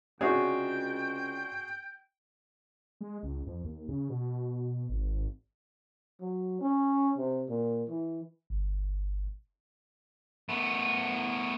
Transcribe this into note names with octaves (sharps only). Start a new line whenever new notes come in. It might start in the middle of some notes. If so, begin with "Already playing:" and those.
C#2 C3 D4 F#4 G#4 C#5 G5
G#3
C#2
F2
D#2
C#3
B2
G#1
F#3
C#4
C3
A#2
E3
G1
A3 B3